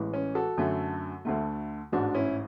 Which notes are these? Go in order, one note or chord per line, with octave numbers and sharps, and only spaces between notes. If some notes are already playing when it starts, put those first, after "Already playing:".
Already playing: A1 A2 E3 G#3
C#4
F#4 A4
F#2 D3 F#3 A3
D2 D3 A3
A1 G#2 G#3 D4 F#4
C#4 E4